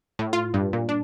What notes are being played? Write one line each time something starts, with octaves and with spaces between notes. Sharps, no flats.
A2
F4
G2
A#2
D4